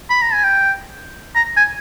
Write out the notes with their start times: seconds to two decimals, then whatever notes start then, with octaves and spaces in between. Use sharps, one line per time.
0.10 B5
0.21 A#5
0.33 G#5
0.44 G5
1.35 A#5
1.56 G#5